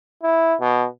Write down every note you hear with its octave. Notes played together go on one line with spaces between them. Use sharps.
E4
B2